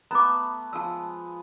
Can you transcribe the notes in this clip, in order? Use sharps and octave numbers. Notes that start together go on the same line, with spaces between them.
A3 B3 A#5 D6
F3 G#3 A5 D#6 E6